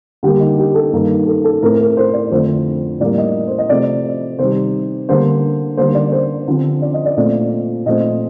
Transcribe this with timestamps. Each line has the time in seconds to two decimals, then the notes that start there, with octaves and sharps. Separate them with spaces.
0.23 D3 G3 A#3 G4
0.40 D#4
0.59 G4
0.75 A4
0.92 G2 D#3 A#3
1.27 A4
1.44 A4
1.63 A2 A3 C4 A#4
1.80 A#4
1.97 C5
2.13 D5
2.31 F2 D3 A3 C4 C5
3.00 A2 G3 A#3 D5
3.18 D#5
3.47 C5
3.58 D#5
3.69 C3 F3 A3 C4 D5
4.39 C3 D#3 G3 C5
5.09 D3 G3 A#3 C5
5.77 D3 G3 A#3 C5
5.95 D5
6.12 C5
6.47 D3 F3 C4
6.82 D5
6.94 D#5
7.06 D5
7.17 A#2 A3 C4 D5
7.85 A#2 F3 A3 C4 D#5